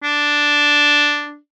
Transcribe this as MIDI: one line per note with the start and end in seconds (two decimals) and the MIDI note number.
0.03 1.38 62